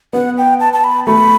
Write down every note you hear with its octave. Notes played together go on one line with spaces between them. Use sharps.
B3 F#5
G5
A5
A5
B5
A3 B5